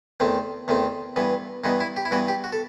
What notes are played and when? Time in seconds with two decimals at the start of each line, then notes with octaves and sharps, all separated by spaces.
0.20 E2 D#3 A3 C4
0.68 E2 D#3 A3 C4
1.16 G2 E3 B3
1.64 G2 E3 B3 D#4
1.80 E4
1.96 G4
2.05 E4
2.11 G2 E3 B3 F#4
2.28 G4
2.44 F#4
2.52 A4